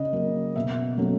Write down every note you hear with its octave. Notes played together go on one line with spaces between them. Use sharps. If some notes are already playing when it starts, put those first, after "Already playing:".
Already playing: C#3 D#5
F#3 A#3 C#4
B2 E5
F#3 A3 C#4